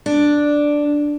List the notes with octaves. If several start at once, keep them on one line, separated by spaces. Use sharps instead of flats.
D4